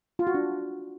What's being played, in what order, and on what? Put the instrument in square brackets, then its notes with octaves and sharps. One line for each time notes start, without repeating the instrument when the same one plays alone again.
[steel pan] F4
F#4
D4